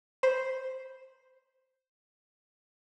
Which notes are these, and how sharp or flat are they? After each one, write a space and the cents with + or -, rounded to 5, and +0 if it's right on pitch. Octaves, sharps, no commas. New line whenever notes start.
C5 +0 B5 +0